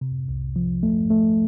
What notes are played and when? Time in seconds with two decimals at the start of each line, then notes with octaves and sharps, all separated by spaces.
0.01 C3
0.28 C2
0.56 F3
0.83 A3
1.10 A3